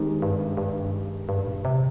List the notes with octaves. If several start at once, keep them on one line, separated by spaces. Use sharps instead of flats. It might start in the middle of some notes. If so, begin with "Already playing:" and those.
Already playing: D#3 G#3 C4 D#4 G4
G2
G2
G2
A#2
C3